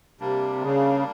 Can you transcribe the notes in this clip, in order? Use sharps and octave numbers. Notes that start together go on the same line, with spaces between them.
C3 G3 A#3 D4
C#3